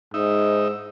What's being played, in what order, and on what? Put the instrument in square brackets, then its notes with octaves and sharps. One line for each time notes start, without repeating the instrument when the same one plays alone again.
[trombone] G#2 [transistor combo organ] D#4 E5